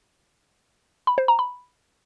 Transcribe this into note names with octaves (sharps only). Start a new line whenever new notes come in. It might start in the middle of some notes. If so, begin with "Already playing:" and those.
B5
C5
A#5
B5